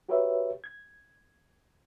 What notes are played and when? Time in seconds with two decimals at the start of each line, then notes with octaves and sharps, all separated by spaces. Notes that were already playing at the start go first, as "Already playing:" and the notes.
0.09 F#4 G4 A#4 B4 C#5 E5
0.64 G#6